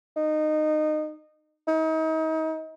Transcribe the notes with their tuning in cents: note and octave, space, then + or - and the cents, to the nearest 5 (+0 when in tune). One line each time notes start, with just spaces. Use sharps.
D#4 -20
D#4 +35